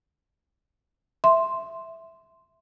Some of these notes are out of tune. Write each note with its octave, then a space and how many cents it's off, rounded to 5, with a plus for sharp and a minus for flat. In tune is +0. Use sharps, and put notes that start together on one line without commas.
E5 +0 C6 +0